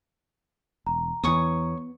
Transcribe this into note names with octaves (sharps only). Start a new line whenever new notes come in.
E1 A#5
E2 E3 B3 C#5 C#6 D#6